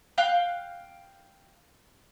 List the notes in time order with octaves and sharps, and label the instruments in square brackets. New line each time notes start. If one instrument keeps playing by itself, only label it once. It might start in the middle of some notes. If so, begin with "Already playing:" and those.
[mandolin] F5 G5 F#6